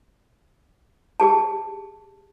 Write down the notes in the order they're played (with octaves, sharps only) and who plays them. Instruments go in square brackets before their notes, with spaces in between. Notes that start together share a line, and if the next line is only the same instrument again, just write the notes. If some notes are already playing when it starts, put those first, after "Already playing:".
[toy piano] G4 G#4 A5